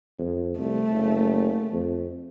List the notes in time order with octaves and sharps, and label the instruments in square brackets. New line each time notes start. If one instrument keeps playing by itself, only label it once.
[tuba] F2
[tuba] C2 [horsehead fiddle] A3
[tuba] F#1
F2